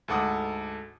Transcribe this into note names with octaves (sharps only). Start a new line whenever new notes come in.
D2 G#2 A4 F#5 D6 D#6